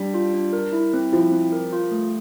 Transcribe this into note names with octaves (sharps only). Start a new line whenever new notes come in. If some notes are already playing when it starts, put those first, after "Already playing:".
Already playing: G3 D4
F4
D4
A#4
E4
C4
F3 E4
C4
A#4
F4
A3